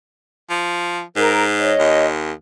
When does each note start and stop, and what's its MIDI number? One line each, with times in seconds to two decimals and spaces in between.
0.50 1.01 53
1.16 1.72 44
1.16 1.42 70
1.58 2.08 73
1.58 2.08 75
1.79 2.32 39